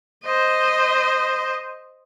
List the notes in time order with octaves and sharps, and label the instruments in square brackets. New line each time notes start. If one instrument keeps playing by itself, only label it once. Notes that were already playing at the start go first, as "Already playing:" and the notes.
[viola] C5 D#5